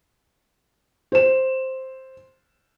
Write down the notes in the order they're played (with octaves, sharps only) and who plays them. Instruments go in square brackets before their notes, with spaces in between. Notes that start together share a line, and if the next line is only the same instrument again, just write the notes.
[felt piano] C5 E7